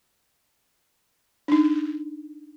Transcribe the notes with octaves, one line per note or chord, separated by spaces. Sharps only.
D4 D#4